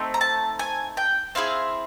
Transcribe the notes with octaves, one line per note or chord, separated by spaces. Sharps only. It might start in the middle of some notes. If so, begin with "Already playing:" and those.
Already playing: A3 C4 D#4
A#5
A5
G#5
G5
C4 E4 G#4 F5